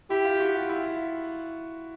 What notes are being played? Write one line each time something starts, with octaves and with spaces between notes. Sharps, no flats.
E4 G4
F4
F#4
F4
E4